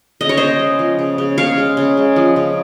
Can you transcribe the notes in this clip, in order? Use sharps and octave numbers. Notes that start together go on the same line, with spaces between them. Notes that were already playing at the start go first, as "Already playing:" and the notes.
C#3 D#5
C#5
C#3 C5 D#5
G#3
F3
C#3
C#3
C#3 C#5 F5
G#3
C#3
G#3
F3
C#3